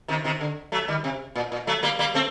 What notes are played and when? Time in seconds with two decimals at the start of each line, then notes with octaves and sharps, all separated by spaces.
0.08 C3 D#3
0.24 C3 D#3
0.41 D3
0.72 F#3 A3
0.88 D#3 G3
1.04 C3
1.35 A#2
1.52 A#2
1.67 F#3 A3
1.83 G3 A#3
1.99 G3 A#3
2.14 A3 C4